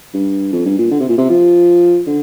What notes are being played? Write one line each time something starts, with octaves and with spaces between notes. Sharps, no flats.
G2
F2
G2
A#2
D3
C3
A#2
C3
F3
D3